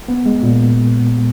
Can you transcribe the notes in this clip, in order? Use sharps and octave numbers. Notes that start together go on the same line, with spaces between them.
B3
G#3
A#2